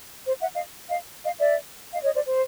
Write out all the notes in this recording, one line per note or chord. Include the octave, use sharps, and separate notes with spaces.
C5
E5 F#5
D#5 F5
D#5 F5
D#5 F5
D5 E5
D#5 F5
C#5 D#5
C5 D5
C5